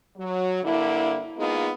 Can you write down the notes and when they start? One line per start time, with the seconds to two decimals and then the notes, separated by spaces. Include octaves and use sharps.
0.17 F#3
0.63 G2 D3 A#3 E4
1.37 G#3 A#3 B3 D#4 F4 G#4